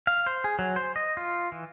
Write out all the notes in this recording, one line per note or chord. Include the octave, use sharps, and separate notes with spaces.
F5
C5
G#4
F#3
C5
D#5
F4
E3